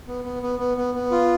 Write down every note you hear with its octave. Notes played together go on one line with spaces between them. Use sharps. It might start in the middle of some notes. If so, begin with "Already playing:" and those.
B3
B3
B3
B3
B3
B3
F4